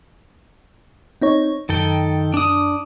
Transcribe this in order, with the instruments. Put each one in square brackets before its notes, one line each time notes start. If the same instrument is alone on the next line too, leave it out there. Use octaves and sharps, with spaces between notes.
[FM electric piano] C4 D#4 C#5
[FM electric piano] F#2 [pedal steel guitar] D#3 A4 G5
[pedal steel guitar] D4 D#6